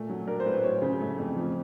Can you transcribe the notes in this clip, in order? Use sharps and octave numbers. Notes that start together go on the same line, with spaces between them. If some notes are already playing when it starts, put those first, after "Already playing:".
Already playing: A#2 A3
F#3
D4 A#4
C5
A2 B4
F#3 C#5
C#3
A3
F2
F3